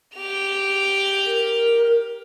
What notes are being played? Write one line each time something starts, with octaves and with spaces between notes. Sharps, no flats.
G4 F7
A#4